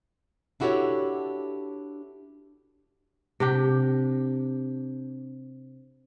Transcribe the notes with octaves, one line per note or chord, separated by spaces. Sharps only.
D4 E4 F#4 G4 A4 C#5
C3 D4 G4